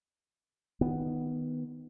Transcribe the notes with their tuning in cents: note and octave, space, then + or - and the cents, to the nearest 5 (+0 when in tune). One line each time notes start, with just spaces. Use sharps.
D#3 +0 B3 +0